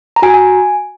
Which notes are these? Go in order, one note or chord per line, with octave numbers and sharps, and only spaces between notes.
A#5
F#4 G#5
G#5